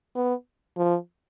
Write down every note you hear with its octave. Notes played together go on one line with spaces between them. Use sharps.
B3
F3